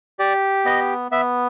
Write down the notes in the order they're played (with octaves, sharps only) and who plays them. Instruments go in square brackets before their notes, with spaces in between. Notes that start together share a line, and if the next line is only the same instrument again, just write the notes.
[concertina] G4 D5
B3 D#5
B3 E5